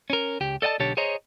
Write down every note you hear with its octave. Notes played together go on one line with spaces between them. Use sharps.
C#4 A#4
C#2 G4
A4 D5 D#5 F#5 A5
B1 D3 G4 C#5 A5
G#4 C5 C#5 D#5 A#5